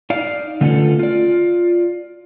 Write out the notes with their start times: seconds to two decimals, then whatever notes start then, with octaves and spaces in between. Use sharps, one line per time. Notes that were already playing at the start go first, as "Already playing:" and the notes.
0.10 D#4 D5 F5
0.61 D3 A3 B3 C#4 F4 A4
0.99 F4 D5